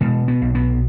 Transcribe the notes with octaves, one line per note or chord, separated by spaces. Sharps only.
B2 G#3
B3
B1
B3